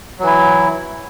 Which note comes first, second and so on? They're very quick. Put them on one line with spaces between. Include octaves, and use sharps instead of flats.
F#3 E3 E4